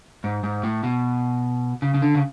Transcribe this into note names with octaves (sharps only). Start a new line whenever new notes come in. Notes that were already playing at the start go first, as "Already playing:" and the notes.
G#2
G#2
A2
B2
C#3
C#3
D3
C#3